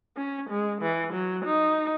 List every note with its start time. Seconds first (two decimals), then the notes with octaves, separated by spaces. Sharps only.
0.17 C#4
0.50 G#3
0.82 E3
1.13 F#3
1.45 D#4